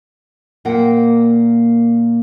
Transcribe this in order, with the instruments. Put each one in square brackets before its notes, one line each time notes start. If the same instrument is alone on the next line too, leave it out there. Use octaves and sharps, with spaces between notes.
[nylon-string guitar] A#2 A#3 F#5 G5